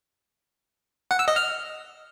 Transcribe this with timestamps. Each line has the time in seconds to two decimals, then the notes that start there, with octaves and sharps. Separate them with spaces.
1.11 F#5
1.19 E6
1.28 D#5
1.36 F6